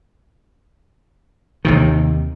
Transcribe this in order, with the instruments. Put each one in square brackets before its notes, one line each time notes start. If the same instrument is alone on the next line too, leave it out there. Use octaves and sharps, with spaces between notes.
[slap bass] D#2 C3 D#3